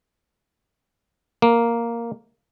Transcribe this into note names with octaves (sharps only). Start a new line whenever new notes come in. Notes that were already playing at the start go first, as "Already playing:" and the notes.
A#3